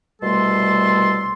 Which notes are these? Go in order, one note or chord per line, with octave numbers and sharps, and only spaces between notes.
C2 B2 G3 A3 A4 C6